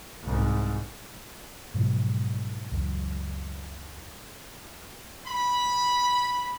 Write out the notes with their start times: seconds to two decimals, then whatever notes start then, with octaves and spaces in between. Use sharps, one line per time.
0.22 C2 G#2
1.74 G#2 B2 F3 F#3
2.72 C#2 F#2
5.26 B5